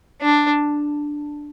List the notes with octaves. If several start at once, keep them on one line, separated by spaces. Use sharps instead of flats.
D4